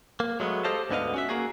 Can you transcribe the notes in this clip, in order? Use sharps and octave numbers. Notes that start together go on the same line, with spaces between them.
A#3
F#3 G#3 A3 B3
G4 A4 C5 D#5 F5 A5
D2 G#2 D3 B3 D#5 F5
C#4 F#4 E5
A#3 F#4 G#4